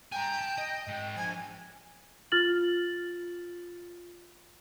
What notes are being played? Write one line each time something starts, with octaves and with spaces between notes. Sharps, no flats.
G5 G#5 A#5
A5
D#5
G#2 G5
F3 D4 G#5
F4 F6 A6 F#7